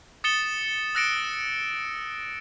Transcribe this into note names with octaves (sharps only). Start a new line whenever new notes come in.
D#6 A6 C#7 E7 G7
E6 F#6 A#6 C#7 D7 E7